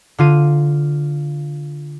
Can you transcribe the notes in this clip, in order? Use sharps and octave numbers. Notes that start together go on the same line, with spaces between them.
D3 F4 D#7